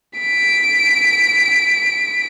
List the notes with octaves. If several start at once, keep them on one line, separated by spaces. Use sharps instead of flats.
B6 D7